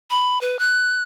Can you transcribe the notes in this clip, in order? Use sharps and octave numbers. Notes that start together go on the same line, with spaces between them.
B5
B4
F#6